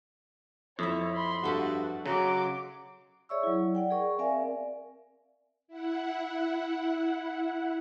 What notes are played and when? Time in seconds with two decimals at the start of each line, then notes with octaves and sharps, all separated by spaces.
0.79 F2 E4 C#5 E5
1.14 B5 C6
1.44 G2 F#4 A4 E5
2.06 C#3 F#3 D#5 C6 D6
3.29 G#4 C#5 D5 E5 C#6 E6
3.43 F#3 E4
3.75 D5 F#5 G5
3.91 G#4 A#4 D5 C#6
4.19 C4 A#4 D5 E5 F5 G#5
5.68 E4 F#5